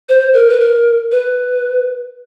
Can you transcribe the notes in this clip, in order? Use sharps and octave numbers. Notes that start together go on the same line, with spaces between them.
C5
A#4
B4
A#4
B4